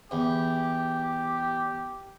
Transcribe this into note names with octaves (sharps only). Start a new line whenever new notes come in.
E2 G4